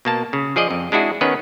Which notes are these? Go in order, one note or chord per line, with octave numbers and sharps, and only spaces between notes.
B2 A#3 A5
C#3
F3 G#4 D5 D#5
F2
G#3 D4 E4 F#4 G#4
D#3 B3 C#4 B4